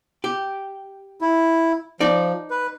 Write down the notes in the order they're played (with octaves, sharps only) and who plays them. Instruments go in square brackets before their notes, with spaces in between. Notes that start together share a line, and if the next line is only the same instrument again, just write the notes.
[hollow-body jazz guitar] G4
[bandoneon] E4
[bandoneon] F3 [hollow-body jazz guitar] D#4 D5
[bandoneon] B4